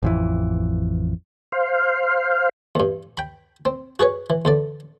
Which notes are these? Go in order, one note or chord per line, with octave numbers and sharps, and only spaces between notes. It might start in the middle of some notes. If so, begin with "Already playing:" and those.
A1 F2 E3
C5 F5
E2 G2
G5 B5
C4
F#4 G#4 B4 C#5
E3
E2 D3 D5